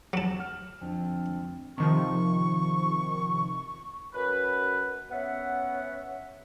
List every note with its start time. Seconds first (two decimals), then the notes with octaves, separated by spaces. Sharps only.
0.13 F#3 A5 F#7
0.40 F6
0.81 F2 D3
1.78 C3 D#3 F3 C#6
4.14 F#2 B4
5.11 B3 C#4 E5 F#5